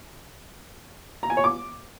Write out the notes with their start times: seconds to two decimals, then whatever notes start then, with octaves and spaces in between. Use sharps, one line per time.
1.23 A#5
1.30 G#5
1.37 C#5
1.44 D6